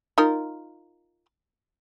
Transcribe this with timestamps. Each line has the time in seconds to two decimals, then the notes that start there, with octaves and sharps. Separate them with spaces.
0.18 D#4 F4 A#4